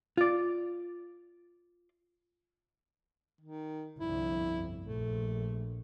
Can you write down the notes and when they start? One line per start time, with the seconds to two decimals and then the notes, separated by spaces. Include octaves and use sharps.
0.17 F4 D5
3.41 D#3
3.99 G1 C2 F2 E4
4.83 A#1 A3